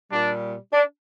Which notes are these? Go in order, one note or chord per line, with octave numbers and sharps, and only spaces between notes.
A#2 G3 D4
D4